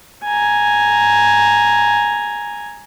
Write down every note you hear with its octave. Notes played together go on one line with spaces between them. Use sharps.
G#5 A#5